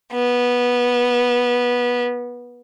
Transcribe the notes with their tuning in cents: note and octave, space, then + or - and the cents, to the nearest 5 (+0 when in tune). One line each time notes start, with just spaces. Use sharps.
B3 -15